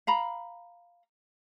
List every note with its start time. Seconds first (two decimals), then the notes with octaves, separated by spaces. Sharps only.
0.07 F5 A#5 B5